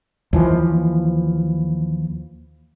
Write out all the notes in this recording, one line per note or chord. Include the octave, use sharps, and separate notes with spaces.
D#2 E3 F3